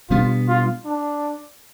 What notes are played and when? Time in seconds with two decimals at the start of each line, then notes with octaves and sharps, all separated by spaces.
0.10 B2 G3 B3 D4 F4
0.48 F4
0.85 D4